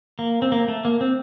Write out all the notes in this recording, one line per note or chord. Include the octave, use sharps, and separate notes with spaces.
A#3
C4
A#3
A3
A#3
C4